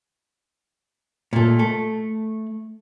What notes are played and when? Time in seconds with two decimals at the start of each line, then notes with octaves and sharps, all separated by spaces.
1.33 A#2 A3
1.59 A3